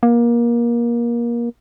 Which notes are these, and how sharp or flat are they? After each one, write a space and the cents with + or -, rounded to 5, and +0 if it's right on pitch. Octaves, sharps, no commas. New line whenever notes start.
A#3 +25